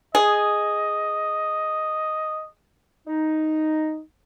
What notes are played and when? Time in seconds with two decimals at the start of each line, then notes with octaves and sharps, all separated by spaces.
0.15 G#4 D#5
3.07 D#4